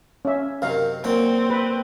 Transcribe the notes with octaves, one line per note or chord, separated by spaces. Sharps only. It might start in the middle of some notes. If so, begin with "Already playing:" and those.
C#4 E5
F#2 C3 D#3 F5
A#2 F#3 C4 G5
B4